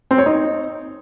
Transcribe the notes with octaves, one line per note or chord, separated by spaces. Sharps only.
C4
C#5
D#4